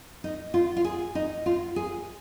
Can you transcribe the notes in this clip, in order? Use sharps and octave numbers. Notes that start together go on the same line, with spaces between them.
D#4
F4
F4
G#4
D#4
F4
G#4